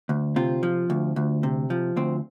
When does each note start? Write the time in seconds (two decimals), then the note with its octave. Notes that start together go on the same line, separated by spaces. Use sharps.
0.09 D2
0.36 C3 C4 F4
0.63 F3
0.90 D2
1.16 D2
1.43 C3
1.70 F3
1.96 D2 C4